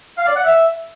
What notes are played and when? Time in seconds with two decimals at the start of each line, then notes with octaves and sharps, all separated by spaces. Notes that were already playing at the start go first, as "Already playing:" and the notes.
0.17 F5
0.26 D5
0.35 F#5
0.44 E5